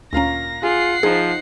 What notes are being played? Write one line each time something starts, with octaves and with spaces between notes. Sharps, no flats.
D2 A#2 C#4 F5 A#5 A#6
F4 G#4 F#5 C7
F3 D#4 F4 G#4 C5